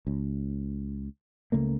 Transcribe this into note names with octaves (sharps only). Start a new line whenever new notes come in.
C#2
C#2 C#3 A3 A#3